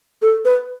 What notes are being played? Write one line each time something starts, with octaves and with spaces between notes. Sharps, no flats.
A4
B4